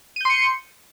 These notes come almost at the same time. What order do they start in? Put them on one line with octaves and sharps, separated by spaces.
D#7 G6 C6 C#7